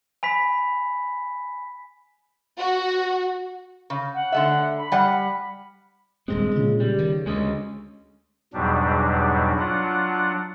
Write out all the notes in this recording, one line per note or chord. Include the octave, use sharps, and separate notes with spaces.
G#5 B5 B6
F#4
C#3
F#5
D3 A3 E5
B5
G3 F#5
D#1 G2 G#3 C4
A#2 C#3
G3
D#3
D2 G#3 C#4 D#5
E2 G#2 B2 F#3 G3 D4
F#3 D4 F4 F#5